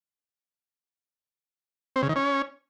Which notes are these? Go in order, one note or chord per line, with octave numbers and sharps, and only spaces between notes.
C4
C#3
D#3
C#4